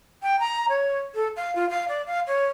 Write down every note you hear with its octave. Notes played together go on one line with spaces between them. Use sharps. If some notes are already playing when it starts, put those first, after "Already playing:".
G5
A#5
C#5
A4
F5
F4
F5
D5
F5
C#5